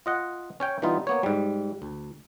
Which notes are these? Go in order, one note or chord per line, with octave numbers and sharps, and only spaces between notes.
F4 D#5 F#5
C#4 C#5 G5
E3 G3 B3 D#4 F4
A#3 B3 C#5
G#2 G3
D2